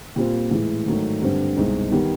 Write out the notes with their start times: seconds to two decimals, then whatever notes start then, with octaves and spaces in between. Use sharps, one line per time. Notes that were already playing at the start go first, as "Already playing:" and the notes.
0.16 A#2 G3 C4 F4
0.51 A2 E3 G#3
0.86 G#2 D#3 F#3 A3
1.22 G2 D3 G3 C4
1.57 C2 B2 G#3 C4 D#4
1.91 D#3 G3 B3